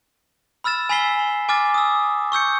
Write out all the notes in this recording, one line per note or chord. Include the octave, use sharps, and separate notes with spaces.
B5 E6 F6 A6 E7
G#5 B5 E6 B6 C7 G7
G#5 D6 F6 A6
D#6 E6
C#6 E6 G6 C#7